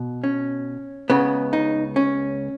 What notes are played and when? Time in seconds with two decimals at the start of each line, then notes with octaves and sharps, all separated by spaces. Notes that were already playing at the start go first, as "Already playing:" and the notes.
Already playing: B2
0.24 C#4
1.10 C#2 C#3 B3
1.53 D#4
1.96 C#4